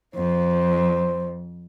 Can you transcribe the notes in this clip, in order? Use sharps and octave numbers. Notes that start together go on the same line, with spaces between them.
F2 C5